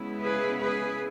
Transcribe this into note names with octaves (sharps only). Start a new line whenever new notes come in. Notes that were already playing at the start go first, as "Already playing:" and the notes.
Already playing: C#3 G#3 B3 E4
G#4 B4
G#4 B4